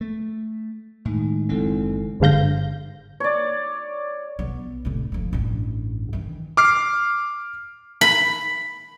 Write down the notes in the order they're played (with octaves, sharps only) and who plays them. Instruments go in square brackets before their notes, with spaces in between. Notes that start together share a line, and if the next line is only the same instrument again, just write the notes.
[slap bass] A3
[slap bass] A2 [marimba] D#3 G#3 D#4
[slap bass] F#1 G#2 C4 [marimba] G#3 E4 A4
[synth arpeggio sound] G1 G#2 D3 F5 G6 A#6
[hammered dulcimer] C#5 D5
[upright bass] B1 B3
A2 C3
D2 F3
A1 G2
D#3 E3
[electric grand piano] D6 F6 C7
[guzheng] B5